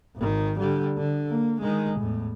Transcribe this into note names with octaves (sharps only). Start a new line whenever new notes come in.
G#1 D#3
D3 G3
D3
A#3
D#3 G#3
E2 A2